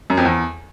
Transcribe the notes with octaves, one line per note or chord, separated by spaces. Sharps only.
F#2
F2
E2